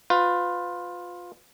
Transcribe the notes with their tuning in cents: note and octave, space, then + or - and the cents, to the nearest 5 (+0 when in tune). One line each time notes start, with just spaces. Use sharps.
F4 +20 B4 +30